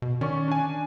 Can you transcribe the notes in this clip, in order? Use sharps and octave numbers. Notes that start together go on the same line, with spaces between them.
B2
D#3 C#4 D5 C#6
D4 G#5